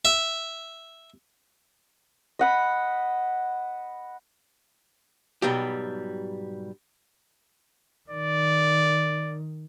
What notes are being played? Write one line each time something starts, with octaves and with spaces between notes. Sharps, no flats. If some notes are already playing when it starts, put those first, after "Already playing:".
E5
D#5 F#5 B5
G#2 B2 F#3 G3 G4
D#3 D5